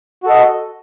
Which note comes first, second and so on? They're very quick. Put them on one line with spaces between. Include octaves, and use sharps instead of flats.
F#4 A4 D#5